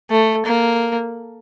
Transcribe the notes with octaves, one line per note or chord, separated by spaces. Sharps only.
A3
A#3